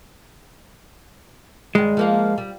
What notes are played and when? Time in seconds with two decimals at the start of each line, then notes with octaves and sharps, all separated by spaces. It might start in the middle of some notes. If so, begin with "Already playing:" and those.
1.75 G2 D#3 G#3
1.97 F3 A#3 F5
2.38 G3